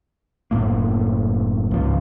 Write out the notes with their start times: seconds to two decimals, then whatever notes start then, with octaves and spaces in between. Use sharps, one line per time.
0.51 F#1 E2 A2 A#3
1.71 C#2 G#2 F3